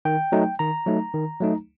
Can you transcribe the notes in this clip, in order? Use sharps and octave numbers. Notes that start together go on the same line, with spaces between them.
D#3 G5
F#3 A3 D#4
D#3 A#5
F#3 A3 D#4
D#3
F#3 A3 D#4